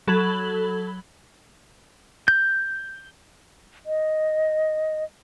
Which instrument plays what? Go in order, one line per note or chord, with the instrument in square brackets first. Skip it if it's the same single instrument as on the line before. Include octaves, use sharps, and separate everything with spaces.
[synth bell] F#3 A4 B5 G#6 F#7
[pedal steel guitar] G6
[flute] D#5